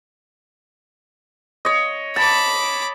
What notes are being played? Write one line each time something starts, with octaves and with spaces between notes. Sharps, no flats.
C#5 D#5
A5 B5 D6